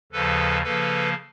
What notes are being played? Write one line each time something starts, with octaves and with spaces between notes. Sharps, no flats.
D#2 C#3 F3 A4 B4
C#3 F3 A#3 A4 B4